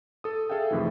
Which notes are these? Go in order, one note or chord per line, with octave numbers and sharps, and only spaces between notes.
A4 D#6
G#4 A4 E5 F5 G5
F2 A2 C3 D#3 E3